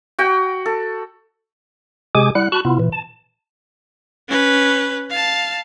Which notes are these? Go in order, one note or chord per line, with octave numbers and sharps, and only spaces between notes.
F#4 G5
A4
C3 G#3 G4 G#4 G#5 D6
G3 E4 F#5 F#6
F#4 A5 B5 C#6 F#6
C3 B3 E4 F4
A#2 E3
A5
C#4 B4
F5 A5